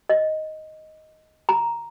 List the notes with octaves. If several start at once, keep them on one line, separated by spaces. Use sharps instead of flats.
D#5
A#5